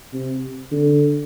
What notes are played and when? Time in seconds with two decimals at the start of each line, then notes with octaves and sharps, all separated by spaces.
0.13 C3
0.72 D3